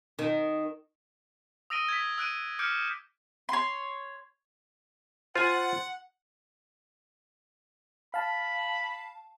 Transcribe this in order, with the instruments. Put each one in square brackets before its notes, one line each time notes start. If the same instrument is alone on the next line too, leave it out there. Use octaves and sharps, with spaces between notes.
[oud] D#3
[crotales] D#6 E6 A#6 D7 D#7 G7
G#6 B6
E6 F#6 D7 D#7
D6 F6 G6 C#7 D7
[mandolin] C#5 C6
[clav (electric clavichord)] F4 G#5 [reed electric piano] C5 [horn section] F#5 [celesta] C6 G6 A6
[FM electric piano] F5 A5 [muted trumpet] B5